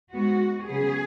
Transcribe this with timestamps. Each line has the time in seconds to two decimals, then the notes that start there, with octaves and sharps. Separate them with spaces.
0.12 G#2 G#3 B3 F#4
0.67 C#3 F#3 B3 G#4